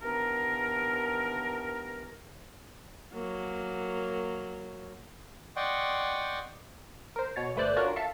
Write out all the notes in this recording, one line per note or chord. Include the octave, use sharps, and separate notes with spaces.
D#2 E3 B3 D4 A#4
F#3 A#3
D5 D#5 F#5 G5 C6 C#6
A#4 C5
B2 C#5 A6
G1 A3 B4 C5 D5 F#6
C#4 D4 F4 F#4 A#4
A4 E5 F5 A5